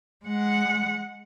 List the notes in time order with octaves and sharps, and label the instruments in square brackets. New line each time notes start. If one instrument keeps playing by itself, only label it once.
[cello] G#3 F#5